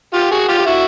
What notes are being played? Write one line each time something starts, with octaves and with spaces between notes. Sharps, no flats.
F4 G4
F#4 G#4
F4 G4
G4
E4 F#4